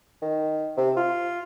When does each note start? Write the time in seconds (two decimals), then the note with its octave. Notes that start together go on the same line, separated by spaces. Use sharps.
0.22 D#3
0.77 C3
0.97 F4